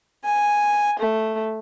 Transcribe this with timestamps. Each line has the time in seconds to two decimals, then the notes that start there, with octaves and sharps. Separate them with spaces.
0.25 G#5
0.98 A3